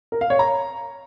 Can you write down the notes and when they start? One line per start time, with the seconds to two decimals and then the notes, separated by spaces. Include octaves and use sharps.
0.12 A#4
0.21 F5
0.30 C#5
0.39 A#5